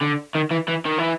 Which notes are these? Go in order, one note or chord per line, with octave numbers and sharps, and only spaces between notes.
D3
D#3
E3
E3
D#3
E3